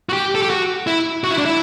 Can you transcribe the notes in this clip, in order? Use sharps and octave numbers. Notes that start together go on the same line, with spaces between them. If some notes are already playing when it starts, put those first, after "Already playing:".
F#4
G4
A4
G4
F#4
E4
F#4
E4
D4
E4